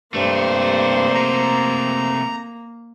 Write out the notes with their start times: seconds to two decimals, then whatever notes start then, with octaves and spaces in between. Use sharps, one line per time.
0.14 G2 C3 A3 A#3 C5
1.15 A#5